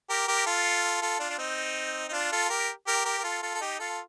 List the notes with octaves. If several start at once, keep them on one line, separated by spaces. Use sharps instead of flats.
G4 A#4
G4 A#4
F4 A4
F4 A4
D4 F4
D4
C4 D#4
D#4
D4 F4
F4 A4
G4 A#4
G4 A#4
G4 A#4
A#4
F4 A4
F4 A4
A4
D#4 G4
F4 A4